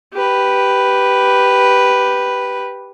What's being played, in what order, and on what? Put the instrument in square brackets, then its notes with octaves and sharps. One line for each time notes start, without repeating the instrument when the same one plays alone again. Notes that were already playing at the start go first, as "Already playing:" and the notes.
[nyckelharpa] G4 B4